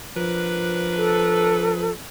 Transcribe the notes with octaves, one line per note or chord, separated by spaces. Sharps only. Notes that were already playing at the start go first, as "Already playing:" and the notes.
F3 D4 A#4 B4
A4